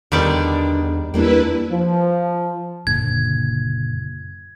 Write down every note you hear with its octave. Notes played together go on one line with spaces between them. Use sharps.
E2 D3 D#3 G3 B3 D4 D5
E2 G3 A#3 D4 E4 B4
F3
F#1 A#2 D3 G#6